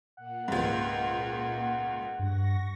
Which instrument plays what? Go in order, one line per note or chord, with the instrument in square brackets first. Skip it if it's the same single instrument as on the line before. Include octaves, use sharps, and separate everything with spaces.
[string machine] A#2 A#3 [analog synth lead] F#5
[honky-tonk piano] C#2 G#2
[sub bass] G2 [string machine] C#6 A#6